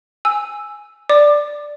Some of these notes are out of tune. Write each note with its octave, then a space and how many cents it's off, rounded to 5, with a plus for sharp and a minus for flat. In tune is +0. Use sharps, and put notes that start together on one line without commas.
G#5 +0 E6 +0
D5 +0 D6 +25